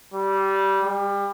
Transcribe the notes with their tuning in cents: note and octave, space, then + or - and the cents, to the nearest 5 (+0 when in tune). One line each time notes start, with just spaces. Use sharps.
G3 -15
G3 +30